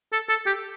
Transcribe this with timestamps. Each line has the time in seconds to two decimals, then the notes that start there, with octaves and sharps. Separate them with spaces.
0.13 A4
0.29 A4
0.46 G4